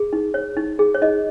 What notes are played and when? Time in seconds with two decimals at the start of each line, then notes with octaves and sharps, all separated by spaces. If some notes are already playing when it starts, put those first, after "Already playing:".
Already playing: G#4
0.13 D#4
0.34 C#5
0.57 D#4
0.79 G#4
0.94 C#5
1.02 D#4 D#5